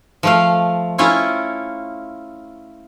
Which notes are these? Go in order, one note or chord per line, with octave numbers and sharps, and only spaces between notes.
F3 A3 F5
C#4 E4 F4 C#5